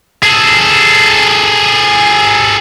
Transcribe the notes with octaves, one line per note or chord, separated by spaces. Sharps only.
G#4 A4